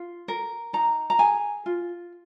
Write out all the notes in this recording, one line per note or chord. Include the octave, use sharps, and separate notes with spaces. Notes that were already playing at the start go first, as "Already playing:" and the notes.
Already playing: F4
A#4
D#4 A#5
A#5
G#4 G#5
F4